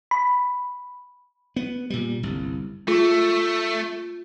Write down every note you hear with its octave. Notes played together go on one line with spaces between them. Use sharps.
B5
B3
A#2 G3
G1 C2
A3 F4